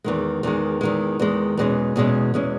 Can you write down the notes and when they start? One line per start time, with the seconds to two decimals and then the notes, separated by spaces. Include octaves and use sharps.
0.04 E2 D#3 G#3
0.43 E2 D#3 G#3
0.81 E2 D#3 G#3
1.20 E2 D#3 G#3
1.57 E2 B2 G#3 C#4
1.96 E2 B2 G#3 C#4
2.34 E2 B2 G#3 C#4